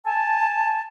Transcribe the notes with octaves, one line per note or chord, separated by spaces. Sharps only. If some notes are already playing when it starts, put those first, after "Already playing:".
G#5 A5